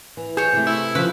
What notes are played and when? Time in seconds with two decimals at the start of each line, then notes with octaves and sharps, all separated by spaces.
0.17 E3
0.37 G#4 C5 C#5
0.53 C3 A3
0.67 E4
0.95 C#3 F3 B4 C5 F5